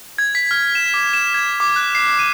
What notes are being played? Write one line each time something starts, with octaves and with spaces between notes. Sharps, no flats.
G#6
B6
F6
E7
D6
E7
G#6
D6
F#6
C7
D#7